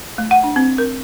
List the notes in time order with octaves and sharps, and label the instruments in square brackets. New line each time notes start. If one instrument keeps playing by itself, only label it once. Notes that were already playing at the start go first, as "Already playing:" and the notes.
[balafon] A3
F#5
D4
C4
A#4